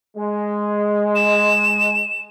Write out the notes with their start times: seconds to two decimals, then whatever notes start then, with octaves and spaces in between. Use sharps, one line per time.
0.17 G#3
1.15 E7